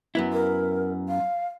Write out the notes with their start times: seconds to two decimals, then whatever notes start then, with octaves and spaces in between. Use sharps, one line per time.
0.15 F#2 B3 E4
0.33 A#4
1.08 F5